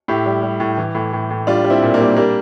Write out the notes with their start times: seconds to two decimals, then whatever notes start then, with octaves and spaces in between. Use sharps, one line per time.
0.08 A2 E4 G4
0.26 G3
0.43 G3
0.60 A2
0.77 E3
0.95 A2
1.13 A2
1.30 A2
1.47 G3 D4 F4
1.65 G3
1.70 C4 E4
1.82 A#2
1.94 A#3 D4
2.00 G3
2.17 G3 A#3 D4